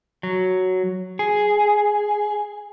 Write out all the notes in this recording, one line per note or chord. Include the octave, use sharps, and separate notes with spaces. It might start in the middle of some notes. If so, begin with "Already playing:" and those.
F#3
G#4